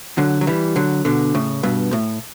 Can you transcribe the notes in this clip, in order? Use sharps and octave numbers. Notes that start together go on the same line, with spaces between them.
D3 F#3
F#3
E3 G3
D3 F#3
B2 D3
A2 C#3
G2 B2
A2